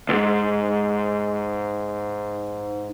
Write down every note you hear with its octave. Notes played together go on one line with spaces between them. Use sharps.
C#2 G#2